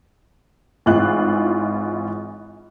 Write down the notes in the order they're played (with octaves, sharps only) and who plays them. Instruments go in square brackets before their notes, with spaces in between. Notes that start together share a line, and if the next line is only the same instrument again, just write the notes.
[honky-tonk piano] G#1 G#2 E3 F4 F#6